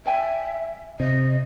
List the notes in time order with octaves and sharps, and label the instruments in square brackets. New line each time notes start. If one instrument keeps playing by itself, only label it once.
[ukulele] D5 G5 G#5 [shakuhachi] E5
[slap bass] C3 [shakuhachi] D#5